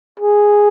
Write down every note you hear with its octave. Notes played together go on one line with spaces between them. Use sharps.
G#4